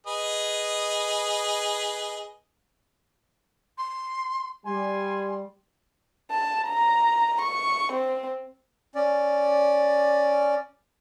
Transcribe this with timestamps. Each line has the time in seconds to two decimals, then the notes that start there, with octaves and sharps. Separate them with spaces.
0.07 G#4 B4 D#5
3.77 C6
4.65 G3 G#5 C6
6.31 A5
6.69 A#5
7.41 C#6
7.93 C4
8.95 C#4 D5